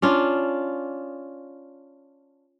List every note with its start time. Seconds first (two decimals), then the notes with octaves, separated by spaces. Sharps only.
0.02 C#4 D4 F4